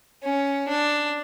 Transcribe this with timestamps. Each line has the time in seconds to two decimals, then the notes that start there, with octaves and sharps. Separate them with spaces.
0.24 C#4
0.68 D4